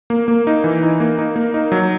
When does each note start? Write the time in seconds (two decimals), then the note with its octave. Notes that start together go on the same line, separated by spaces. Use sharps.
0.10 A#3
0.28 A#3
0.47 D#4
0.64 E3
0.83 D#4
1.00 A#3
1.18 D#4
1.36 A#3
1.54 D#4
1.72 F#3